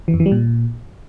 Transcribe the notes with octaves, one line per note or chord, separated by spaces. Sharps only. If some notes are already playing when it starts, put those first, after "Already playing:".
E3
F2
E3
G3
A#2